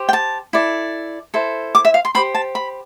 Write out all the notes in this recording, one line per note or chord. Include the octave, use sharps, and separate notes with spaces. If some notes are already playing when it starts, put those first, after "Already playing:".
Already playing: G4 C5
G5
A5
E4 A4 D5
E4 A4 C5
D6
E5
F5
C6
G4 C5 B5
A5
B5